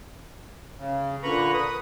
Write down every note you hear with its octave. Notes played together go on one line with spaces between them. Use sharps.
C#3
A#2 D3 B4 A#5 B5 C#6
B4 D#6